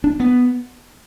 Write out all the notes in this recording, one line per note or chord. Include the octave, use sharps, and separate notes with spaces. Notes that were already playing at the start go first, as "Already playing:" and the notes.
D4
B3